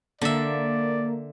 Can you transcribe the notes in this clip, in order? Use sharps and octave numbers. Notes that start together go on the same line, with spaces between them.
D3 A#3 D5 E5